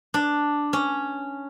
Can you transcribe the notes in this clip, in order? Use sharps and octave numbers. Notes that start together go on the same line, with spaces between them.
D4
C#4